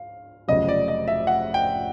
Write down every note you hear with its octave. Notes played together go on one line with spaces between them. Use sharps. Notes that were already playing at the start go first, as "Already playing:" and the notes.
Already playing: F5
F1 F2 C#3 F#3 D#5
D5
D#5
E5
F#5
G5